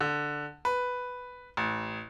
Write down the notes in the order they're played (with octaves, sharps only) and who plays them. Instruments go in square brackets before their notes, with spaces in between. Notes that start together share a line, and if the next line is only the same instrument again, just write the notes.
[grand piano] D3
B4
A1